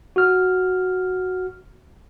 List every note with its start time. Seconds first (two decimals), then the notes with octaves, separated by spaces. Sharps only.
0.16 F#4 F6